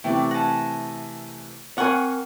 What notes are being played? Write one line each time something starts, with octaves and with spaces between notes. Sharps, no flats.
C3 E3 A3 D5 G5
F#5 G#5 A5 A#6
C4 A#4 F#5 G#5 B5 C#6